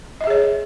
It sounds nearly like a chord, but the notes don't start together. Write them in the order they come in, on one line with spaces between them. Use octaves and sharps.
D#5 E5 G#4 C#5